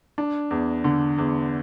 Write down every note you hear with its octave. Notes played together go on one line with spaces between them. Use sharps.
D4
E2
D3
E2